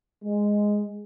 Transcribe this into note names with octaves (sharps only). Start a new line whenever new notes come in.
G#3